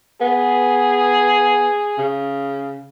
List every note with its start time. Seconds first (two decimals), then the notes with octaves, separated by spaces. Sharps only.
0.21 B3 G#4
1.98 C#3